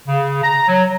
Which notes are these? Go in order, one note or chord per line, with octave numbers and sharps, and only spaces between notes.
C#3
A#5
F#3